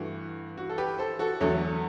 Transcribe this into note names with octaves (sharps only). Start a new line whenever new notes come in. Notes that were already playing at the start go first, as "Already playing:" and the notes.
Already playing: G2 E3 A3 F#4
F#4
A4
G4 B4
A4 C5
F#4 A4
E2 D3 F#3 A3 F#4 A4